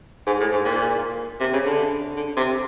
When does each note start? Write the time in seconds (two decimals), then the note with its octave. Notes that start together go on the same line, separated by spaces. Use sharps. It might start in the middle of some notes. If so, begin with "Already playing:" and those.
0.27 G#2
0.40 A2
0.52 G#2
0.65 A#2
1.40 C3
1.53 C#3
1.66 D3
2.17 D3
2.36 C3